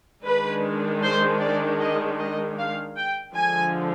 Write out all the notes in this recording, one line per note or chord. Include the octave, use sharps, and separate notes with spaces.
D#3 G#3 D4 B4
C5
D5
D#5
D#5
F5
G5
D3 F3 G#3 G#5